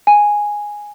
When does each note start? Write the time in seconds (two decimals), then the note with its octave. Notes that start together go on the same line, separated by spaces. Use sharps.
0.07 G#5